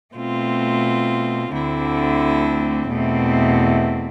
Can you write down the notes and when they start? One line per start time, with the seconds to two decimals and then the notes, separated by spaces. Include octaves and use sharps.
0.16 B2 A3 C4 F4
1.52 D2 D3 A3 C4 E4
2.89 E2 B2 A3 C4